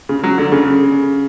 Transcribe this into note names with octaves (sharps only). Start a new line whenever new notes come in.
C#3
F#3
D3
C#3